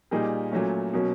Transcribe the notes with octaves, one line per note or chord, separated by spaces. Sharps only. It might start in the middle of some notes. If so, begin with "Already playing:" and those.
A#2 G3 A#3 D#4 G#4
A#2 F#3 A3 C#4
B2 F#3 A#3 C#4